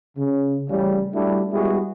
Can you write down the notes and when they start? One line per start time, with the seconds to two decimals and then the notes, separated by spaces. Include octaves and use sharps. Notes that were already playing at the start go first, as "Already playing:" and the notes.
0.17 C#3
0.69 A1 C#3 G3
1.14 G3 A3 D4 E4 F#4 G4
1.52 G3 G#3 B3 E4 F#4 G#4